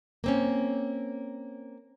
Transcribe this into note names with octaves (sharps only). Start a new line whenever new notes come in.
A#3 C4 C#4